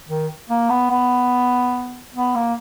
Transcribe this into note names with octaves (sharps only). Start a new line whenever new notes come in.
D#3
A#3
B3
B3
B3
A#3